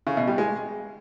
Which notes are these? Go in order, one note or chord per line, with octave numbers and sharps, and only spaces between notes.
C#3
B2
G3
G#3